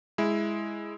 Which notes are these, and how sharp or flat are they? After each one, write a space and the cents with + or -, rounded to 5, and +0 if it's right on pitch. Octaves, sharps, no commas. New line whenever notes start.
G#3 +0 E4 +0